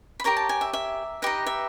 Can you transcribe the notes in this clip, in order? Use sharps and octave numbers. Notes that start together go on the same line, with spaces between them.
B5
G4 A#4 C#5 A#5
A5
G#5
E5
E5
D#4 G4 B4 D#5
E5